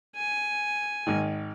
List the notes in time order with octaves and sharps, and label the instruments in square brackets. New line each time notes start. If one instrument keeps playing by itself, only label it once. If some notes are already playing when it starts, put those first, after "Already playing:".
[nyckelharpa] G#5
[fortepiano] G#1 D#3